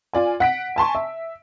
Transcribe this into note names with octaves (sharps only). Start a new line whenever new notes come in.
F4 D5 G#5
F#5 B6 D7
G#5 A5 C6 C#6
E5